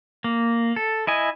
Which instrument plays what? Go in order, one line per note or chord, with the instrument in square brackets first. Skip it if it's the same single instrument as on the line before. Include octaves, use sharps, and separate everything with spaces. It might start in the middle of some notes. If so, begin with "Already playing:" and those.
[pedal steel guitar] A#3
A4
E4 D#5 G#5